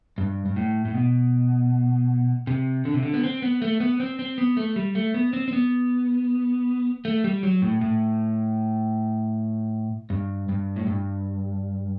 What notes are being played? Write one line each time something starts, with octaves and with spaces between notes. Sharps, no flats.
G2
G2
A2
A2
B2
C3
D3
C3
D3
B3
C4
B3
A3
B3
C4
C4
B3
A3
G3
A3
B3
C4
C4
B3
A3
G3
F#3
A2
A2
G2
G2
A2
G2